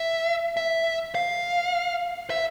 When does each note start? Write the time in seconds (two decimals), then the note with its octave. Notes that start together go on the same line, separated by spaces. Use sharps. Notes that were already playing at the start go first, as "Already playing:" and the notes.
Already playing: E5
0.57 E5
1.15 F5
2.30 E5